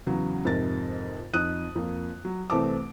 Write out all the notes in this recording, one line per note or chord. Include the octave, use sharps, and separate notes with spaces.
E2 C#3 F#3
F2 G#2 C3 A#4 A6
F2 D#4 D#6 F#6 D#7
F2 A#3
F#3
C2 E3 A3 C4 A5 D6